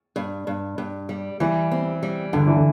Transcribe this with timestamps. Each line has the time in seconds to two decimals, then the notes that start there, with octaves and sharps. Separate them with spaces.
0.16 G2
0.47 G2
0.78 G2
1.09 G3
1.40 E3 G3
1.72 C4
2.03 G3
2.33 G2 D3
2.47 E3
2.56 D3